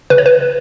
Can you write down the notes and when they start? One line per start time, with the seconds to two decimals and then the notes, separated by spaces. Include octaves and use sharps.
0.10 C#3 B4
0.18 C#5
0.26 B4